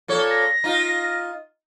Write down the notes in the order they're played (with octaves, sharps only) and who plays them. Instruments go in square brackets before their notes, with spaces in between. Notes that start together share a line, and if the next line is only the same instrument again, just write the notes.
[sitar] A#2 A4 C#5
[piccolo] A#6
[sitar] D#4 F4